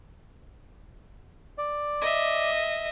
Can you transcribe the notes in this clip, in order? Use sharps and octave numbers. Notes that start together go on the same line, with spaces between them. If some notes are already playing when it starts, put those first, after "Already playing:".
D5
D#5 E5